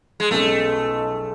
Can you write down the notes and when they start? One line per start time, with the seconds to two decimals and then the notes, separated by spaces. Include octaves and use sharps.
0.20 G#3
0.31 B1 B2 G#3 A3 C#4 G#4